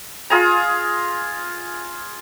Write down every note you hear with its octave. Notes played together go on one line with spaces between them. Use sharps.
F4 G#4 A#5